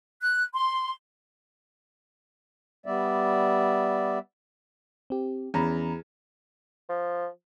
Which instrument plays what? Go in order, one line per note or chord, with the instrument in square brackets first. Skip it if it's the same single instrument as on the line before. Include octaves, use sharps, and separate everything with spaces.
[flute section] F#6
C6
[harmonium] G3 B3 D5 E5
[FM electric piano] C4 G4
[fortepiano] E2 [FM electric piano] C#4 A#5 B5
[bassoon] F3